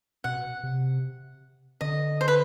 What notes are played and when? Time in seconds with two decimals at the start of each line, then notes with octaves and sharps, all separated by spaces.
0.24 B2 F#5
0.63 C3
1.81 D3 D#5
2.21 C5
2.28 B4